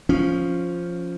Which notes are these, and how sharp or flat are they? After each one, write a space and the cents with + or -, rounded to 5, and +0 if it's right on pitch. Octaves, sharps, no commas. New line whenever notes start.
F3 +0 C#4 +0